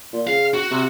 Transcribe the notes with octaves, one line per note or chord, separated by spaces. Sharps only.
A#2
C#3 F5
F#4
C3